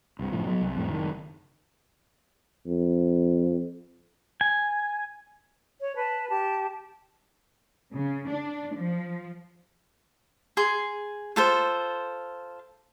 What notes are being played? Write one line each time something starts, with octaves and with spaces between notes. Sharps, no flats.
C2 G2
F#1 A2 F3
F#3 B3
C2
F2 A2 G3
F#1 D#3
F2
G#5
C#5
B4 A5
G4 A5
C#3
D4
F3
G#4 C6
F4 A4 C5